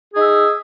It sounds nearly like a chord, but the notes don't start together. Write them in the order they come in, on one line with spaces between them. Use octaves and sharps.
G#4 D#4 E5